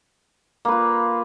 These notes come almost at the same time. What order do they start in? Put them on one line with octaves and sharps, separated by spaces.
A#3 B4 F4